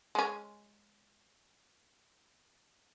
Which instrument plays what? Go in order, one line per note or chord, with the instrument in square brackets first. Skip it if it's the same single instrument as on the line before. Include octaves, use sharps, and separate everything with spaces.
[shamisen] G#3 C#4